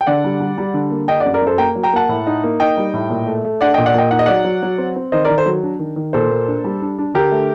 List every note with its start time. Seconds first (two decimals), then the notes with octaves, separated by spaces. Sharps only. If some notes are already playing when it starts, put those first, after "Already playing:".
0.01 G5
0.07 D3 D5 F#5
0.24 G3
0.40 G3
0.58 G3
0.74 D3
0.91 A#3
1.08 D4 D#5 G5
1.20 D5 F#5
1.25 F#2
1.34 A#4 D5
1.42 F#2 A4 C5
1.58 A#3 G5 A#5
1.75 F#3
1.83 G5 A#5
1.93 A#3 F#5 A5
2.09 A2
2.27 D#4
2.44 A#3
2.60 D#4 D#5 G5
2.77 G3
2.94 A2
3.10 A#2
3.27 A3
3.45 A3
3.61 D4 D5 F#5
3.74 A#2 D#5 G5
3.86 D5 F#5
3.94 A#2 D#5 G5
4.11 D#4 F#5
4.19 D#5
4.26 F#3 D5 F#5
4.45 F#3
4.63 F#3
4.78 C4
4.96 C4
5.12 D#3 C5 D#5
5.25 A#4 D5
5.29 D#3
5.38 A4 C5
5.46 F#3
5.63 D4
5.79 D#3
5.96 D#3
6.13 A#2 A4 C5
6.30 A#3
6.48 D4
6.64 G3
6.82 D4
6.99 D4
7.14 D3 G4 A#4
7.32 A3